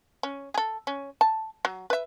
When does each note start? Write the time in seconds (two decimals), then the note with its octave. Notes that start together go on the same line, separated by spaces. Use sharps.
0.23 C#4
0.54 G#4 A4
0.87 C#4
1.21 A5
1.65 F#3
1.90 B4 E5